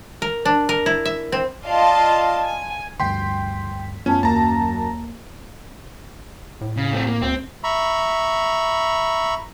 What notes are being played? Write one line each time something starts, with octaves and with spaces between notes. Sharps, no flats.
A#4
D4
A#4
E4
E5
C4
F4 D5 D#5 F5 A5 C6
G#5
D2 G2 G5 C6 B6
F#2 A3 B3 C#4 F4 G#5 A5
D#2 A#3 A5 A#5
A2
C#3
A3 C4
A#3
D2 C4
E5 A#5 B5 C#6